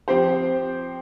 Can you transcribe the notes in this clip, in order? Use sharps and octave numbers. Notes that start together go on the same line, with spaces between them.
F3 C4 G4 C5